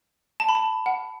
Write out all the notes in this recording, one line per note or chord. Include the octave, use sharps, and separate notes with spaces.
A5
B5
A5
F#5